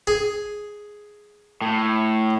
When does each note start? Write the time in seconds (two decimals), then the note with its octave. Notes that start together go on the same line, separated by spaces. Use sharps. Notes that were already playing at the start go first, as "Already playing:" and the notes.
0.07 G#4
1.61 A2